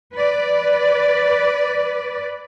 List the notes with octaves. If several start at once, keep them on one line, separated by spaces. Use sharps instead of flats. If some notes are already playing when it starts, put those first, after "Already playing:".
B4 D5